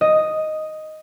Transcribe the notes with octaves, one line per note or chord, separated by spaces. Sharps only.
D#5